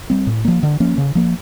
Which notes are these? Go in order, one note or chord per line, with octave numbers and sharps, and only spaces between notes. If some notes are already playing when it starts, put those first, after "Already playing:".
G3 C4
A2
F3 A#3
D3
F3 A#3 C#4
C#3
F3 A#3